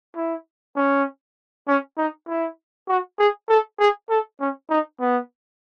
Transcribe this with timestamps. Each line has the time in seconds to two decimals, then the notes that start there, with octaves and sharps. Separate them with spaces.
0.16 E4
0.76 C#4
1.68 C#4
1.97 D#4
2.28 E4
2.88 F#4
3.19 G#4
3.49 A4
3.79 G#4
4.10 A4
4.40 C#4
4.70 D#4
5.00 B3